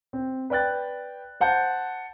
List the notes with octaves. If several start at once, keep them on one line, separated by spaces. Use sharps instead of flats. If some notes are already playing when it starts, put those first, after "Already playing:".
C4
B4 D5 G5 F#6 A6
C5 F#5 A5 G6